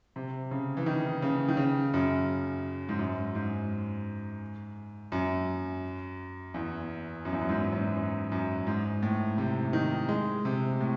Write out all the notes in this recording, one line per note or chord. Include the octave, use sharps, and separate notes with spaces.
C3
C#3
E3
D#3
C#3
D#3
C#3
F#2
G#2
F#2
G#2
F#2
E2
F#2
E2
F#2
G#2
F#2
F#2
F#2
G#2
A2
C3
D#3
G#3
C3
A2